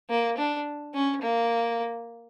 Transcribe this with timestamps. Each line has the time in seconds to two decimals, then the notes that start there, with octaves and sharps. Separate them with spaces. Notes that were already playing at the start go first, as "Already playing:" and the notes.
0.10 A#3
0.38 D4
0.94 C#4
1.22 A#3